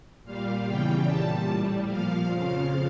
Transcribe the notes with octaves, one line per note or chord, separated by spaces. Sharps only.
A#2 G3 F5
E2 C#3 E3 G3 G5
A#2 G3 A5
A2 G3
A#2 F3 F5
F2 C#3 F3